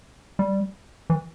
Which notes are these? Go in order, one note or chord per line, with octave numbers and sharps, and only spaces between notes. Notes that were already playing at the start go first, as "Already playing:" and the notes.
G3
E3